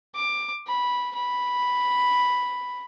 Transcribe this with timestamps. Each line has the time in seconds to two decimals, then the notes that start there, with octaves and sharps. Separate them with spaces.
0.15 D6
0.67 B5
1.15 B5